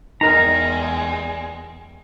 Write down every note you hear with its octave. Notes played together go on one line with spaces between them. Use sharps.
E2 G3 G#3 D#4 A#4 A#5